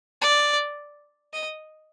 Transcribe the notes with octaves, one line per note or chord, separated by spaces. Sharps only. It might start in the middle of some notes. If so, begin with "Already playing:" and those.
D5
D#5